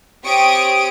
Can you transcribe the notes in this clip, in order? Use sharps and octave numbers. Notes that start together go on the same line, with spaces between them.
C4 G4 C#5 C#6 D#6 D7